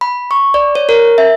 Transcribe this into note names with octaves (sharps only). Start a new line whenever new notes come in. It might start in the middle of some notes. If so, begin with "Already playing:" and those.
B5
C#6
D5
C#5
A#4
E5